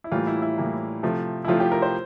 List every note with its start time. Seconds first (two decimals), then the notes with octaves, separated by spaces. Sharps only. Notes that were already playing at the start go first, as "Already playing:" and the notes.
0.04 E4
0.12 A2 E3 G3 A#3 F4
0.27 E4
0.42 E4
0.58 A2 E3 G3 A#3
1.03 C3 F3 A3
1.45 E4
1.48 C3 F3 A3 F4
1.60 G4
1.72 A#4
1.82 C5